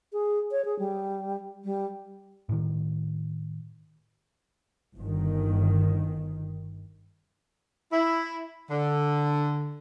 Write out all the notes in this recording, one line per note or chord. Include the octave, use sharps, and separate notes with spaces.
G#4
C#5
G#4
G3
G3
A2 D#3
G1 D#3
E4
D3